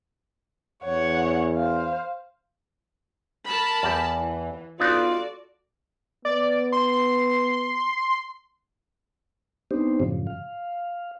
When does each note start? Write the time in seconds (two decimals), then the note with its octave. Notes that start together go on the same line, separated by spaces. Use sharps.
0.84 E2 C#5 F#5
1.56 C5 F5
3.46 A#4 A5 B5
3.83 E2 G4
4.15 E3
4.80 B3 D4 D#4 F4 F#4 A4 D5
6.25 B3 D5
6.72 C6
9.71 B3 C4 D4 D#4 G4 C5
10.00 F#2 A2 C#3 F3
10.27 F5